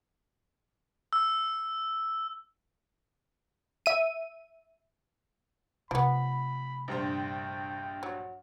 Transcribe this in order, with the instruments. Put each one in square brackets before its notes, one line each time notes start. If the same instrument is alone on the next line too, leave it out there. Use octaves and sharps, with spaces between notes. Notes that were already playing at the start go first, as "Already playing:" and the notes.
[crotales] E6
[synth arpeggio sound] E5 D#7
[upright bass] C3 A3 [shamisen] F3 B3 [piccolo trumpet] B5
[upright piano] A#1 G2 C5 [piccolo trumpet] G5
[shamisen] F#3